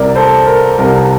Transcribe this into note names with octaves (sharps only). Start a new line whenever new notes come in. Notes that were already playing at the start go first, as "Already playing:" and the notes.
Already playing: C2 C3 G3 A#4 D5
A4 C5
A#4
C2 C3 G3 A#4